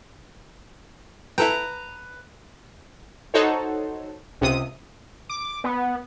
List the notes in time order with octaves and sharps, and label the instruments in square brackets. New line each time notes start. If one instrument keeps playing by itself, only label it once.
[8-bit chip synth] E4 A4 G5 [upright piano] B4 [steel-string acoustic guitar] A#5
[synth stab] D#4 F#4 A4 C5 C#5
C#2 C3 D#6
[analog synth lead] D6
B3